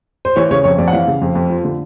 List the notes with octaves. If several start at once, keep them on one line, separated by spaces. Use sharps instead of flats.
C5
E3 C#5
C#3 C#5
F2 C#5
F2 D5
F#5
E3 F5
C#3
F2
F2
F3
D3